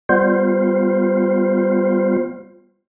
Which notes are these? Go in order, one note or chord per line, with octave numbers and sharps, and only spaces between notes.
G3 B3 F4 C5